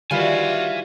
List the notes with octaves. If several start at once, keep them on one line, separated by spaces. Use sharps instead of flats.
D#3 E3 G3 F4 F#4 E5 F5 G#5